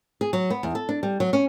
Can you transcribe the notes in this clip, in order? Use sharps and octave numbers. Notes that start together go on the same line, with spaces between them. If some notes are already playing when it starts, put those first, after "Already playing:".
G#4
F#3
B3
E2
A4
D4
G3
F#3
C#4